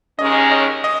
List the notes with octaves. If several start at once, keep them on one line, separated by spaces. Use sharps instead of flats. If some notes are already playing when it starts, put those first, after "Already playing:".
D#2 D#3 G#3 C#4 D#5
D#5
D#5